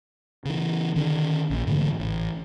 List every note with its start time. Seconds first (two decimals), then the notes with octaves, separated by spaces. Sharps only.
0.45 C#3 E3
0.95 D3 D#3 C#4
1.50 A#1
1.67 G#2 D3 E3 A3
2.00 A1